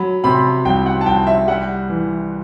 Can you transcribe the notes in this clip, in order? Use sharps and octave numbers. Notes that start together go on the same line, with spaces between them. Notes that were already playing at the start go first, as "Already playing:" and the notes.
Already playing: F#3 B5
C3 B5
C2 G5
F#5
A5
C2 G5
E5
G3 F#5
E3